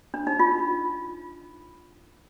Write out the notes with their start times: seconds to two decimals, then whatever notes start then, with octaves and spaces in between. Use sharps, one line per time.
0.14 D4
0.27 D#4
0.39 F4